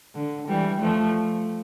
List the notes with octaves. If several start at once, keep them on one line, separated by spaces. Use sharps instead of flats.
D3
E3 G3
F3 A3